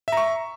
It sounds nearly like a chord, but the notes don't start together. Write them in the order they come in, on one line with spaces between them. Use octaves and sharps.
E5 A#5 C#6